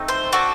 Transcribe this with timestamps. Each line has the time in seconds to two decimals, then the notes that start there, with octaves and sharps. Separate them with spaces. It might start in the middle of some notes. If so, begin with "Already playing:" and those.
Already playing: A3 C4 D#4
0.08 C5
0.33 D4 F#4 A4